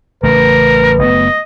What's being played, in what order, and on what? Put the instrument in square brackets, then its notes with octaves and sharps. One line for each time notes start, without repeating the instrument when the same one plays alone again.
[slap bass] A1 C#3 A3 [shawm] A#4 [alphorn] B4
[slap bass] F#1 A3 B3 [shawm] D#5